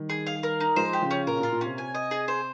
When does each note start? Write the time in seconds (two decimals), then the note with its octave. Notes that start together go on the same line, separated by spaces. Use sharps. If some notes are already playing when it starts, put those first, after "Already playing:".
Already playing: D#3 G3
0.10 G#4
0.27 F5
0.43 A#4
0.60 D#4
0.76 F3 G#3 C5
0.93 G4
1.02 C#3 F3
1.11 C#4
1.27 A#2 C#3 A#4
1.40 A#2 F4
1.52 A#2
1.61 C3 C#4
1.78 G#5
1.95 D#5
2.11 G#4
2.28 C5